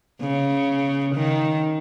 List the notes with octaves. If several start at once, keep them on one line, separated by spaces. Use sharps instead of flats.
C#3
D#3